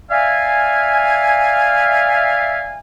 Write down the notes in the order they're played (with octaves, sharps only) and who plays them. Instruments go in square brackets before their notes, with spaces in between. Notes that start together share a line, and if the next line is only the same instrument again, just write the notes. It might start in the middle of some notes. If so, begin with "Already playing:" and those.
[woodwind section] D5 E5 F5 G#5